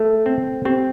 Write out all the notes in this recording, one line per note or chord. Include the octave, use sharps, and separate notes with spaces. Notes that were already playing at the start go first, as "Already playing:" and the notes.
Already playing: A3 A4
C4
C4 G4